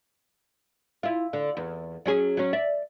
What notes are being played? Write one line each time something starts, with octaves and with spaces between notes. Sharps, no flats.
E4 F4
D3
E2
F#3 C#4 G#4
F#3 C#4
D5 E5